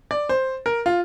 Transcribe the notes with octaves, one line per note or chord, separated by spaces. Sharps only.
D5
C5
A#4
F4